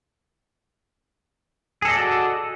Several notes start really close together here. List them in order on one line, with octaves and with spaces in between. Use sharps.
G#4 A4 D#5 D5 F#4